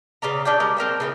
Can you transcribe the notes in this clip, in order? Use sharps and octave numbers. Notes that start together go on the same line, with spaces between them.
C#3 B3 D5 A#5
C#4 D4 D5 G5
G3 G#3 A#4
C4 A#4 C5 G5
C#3 E3 B3